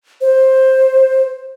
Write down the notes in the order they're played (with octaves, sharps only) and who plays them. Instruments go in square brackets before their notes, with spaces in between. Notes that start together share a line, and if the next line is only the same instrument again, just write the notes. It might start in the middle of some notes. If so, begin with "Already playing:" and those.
[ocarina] C5